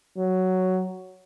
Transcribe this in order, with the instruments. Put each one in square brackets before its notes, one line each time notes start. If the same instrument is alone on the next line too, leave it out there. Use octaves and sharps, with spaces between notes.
[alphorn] F#3